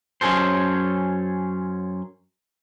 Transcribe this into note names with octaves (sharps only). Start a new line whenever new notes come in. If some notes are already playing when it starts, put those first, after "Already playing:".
F#2 C#4 G#4 A4 C5